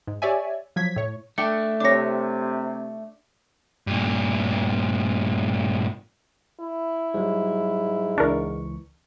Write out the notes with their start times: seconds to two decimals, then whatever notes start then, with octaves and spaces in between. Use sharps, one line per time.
0.07 G#2
0.22 G4 C#5 D5 E5 G#5
0.76 F3 F#3 G#6 B6
0.96 A2 C#5
1.38 A3 D4 G5 C#7
1.80 C3 D4 C#5 D6 A#6
3.87 G2 A#2
6.60 E4
7.14 G#2 F#3 G3
8.18 C#2 E3 D4 A#4 C#6